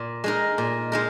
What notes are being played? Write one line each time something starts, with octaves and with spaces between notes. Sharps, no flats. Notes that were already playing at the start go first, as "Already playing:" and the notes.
Already playing: A#2
G#3 D#4 A#4
A#2
G#3 D#4 A#4